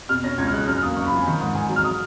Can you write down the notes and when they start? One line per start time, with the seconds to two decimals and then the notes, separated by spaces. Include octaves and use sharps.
0.09 B2 F6
0.24 C#4 A#6
0.38 C#2 G#6
0.47 F6
0.52 G#3 F#6
0.67 F#2 F6
0.77 F6
0.82 A#3 D#6
0.96 F#1 C#6
1.06 B5
1.12 F3 G#5
1.27 D#3
1.41 G#2
1.55 G#2 G#5
1.69 F#3
1.76 F6
1.84 D#6